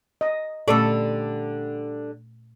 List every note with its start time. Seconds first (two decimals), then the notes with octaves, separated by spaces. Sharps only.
0.21 D#5
0.68 A#2 D3 G3 A3 C#4 A4 D5